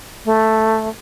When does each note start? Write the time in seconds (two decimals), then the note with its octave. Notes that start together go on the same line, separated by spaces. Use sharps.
0.25 A3